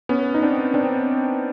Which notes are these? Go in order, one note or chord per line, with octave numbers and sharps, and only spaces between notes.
B3 C#4
D#4
C4 D4
C4 D4